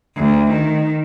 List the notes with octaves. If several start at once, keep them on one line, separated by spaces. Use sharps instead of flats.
D2
D#3